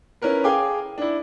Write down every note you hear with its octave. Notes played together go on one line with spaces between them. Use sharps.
C#4 E4 A#4 B4
G#4 F5 G5 G#5 D6
D4 E4